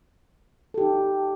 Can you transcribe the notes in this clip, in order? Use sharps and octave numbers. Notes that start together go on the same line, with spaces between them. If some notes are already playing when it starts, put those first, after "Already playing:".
D#4 G4 A4